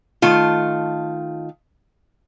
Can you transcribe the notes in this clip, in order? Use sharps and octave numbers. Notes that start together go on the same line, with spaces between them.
D#3 A3 F4